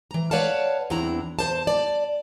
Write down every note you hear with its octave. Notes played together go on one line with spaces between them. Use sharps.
E3 A#5
B4 C#5 D5 F5 F#5 A5
E2 C4 D4 E4 A#5
E2 C5 A5
D5 A5